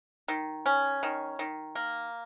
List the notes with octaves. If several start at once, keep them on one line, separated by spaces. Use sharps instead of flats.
D#3
C#4
D#3
D#3
A#3